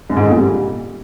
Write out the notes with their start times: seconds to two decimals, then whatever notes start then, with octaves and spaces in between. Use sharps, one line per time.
0.10 F#2
0.17 G#2
0.24 D3
0.30 A#2
0.37 G3